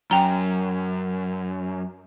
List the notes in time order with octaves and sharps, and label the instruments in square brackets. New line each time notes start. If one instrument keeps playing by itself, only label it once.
[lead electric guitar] F#2 [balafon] G5 A#5